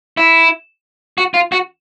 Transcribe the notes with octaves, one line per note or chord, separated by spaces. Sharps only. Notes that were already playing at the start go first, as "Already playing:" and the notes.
E4
F#4
F4
F#4